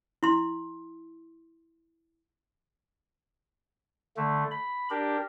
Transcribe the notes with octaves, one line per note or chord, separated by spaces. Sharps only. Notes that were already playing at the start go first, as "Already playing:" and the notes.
E4 C6
D3 A3
B5
D4 G4 A#4